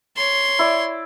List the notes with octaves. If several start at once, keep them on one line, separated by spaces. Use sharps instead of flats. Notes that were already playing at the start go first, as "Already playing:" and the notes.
C#5 C6
E4 D5